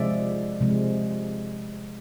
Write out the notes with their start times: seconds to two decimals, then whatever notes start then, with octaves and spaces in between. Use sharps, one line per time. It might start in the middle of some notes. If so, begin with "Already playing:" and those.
Already playing: C3 F3 G#3 D5 E5
0.61 C3 F3 G#3